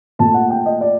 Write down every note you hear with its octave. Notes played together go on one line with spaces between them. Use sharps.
A#2 A3 A5
F#5
G5
D#5
D5